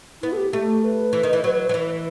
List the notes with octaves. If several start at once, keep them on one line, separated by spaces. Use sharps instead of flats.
B3 E4
A4
G4
A3 G4
B4
E3
D#3
E3
F#3
F#3
E3